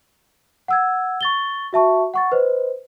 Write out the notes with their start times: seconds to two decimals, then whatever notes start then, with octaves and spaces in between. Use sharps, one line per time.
0.68 F#5 E6 G#6
1.21 C#6 A6 G7
1.73 F#4 E5 A5 C#6
2.14 F#5 C#6 A6
2.32 B4 C5 D#5